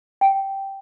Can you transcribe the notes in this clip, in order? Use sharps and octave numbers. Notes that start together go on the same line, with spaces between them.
G5